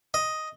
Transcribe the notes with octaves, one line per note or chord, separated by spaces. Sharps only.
D#5